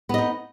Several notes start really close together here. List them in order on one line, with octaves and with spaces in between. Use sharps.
B3 D#5 D#4